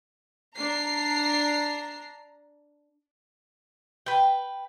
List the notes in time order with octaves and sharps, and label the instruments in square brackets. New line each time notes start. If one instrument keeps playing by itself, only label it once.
[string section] D4 A#5 C7
[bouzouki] B4 G5